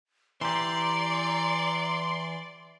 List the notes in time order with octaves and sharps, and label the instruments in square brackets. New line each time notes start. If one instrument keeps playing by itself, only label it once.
[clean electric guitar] E3 G4 [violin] D5 [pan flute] A#5 [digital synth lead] C6